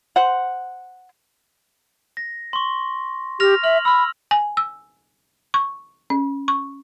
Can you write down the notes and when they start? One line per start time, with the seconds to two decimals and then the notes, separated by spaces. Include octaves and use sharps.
0.16 C5 F#5
2.17 A#6
2.53 C6 C#6
3.40 G4 F6 A#6 F7
3.64 E5 F6 F#7
3.85 B5 E6 F6
4.31 G#5
4.57 E6
5.54 C#6
6.10 C#4
6.48 C#6